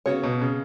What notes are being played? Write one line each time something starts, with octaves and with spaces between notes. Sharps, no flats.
C#3 B3 F#4 C#5
B2
C#3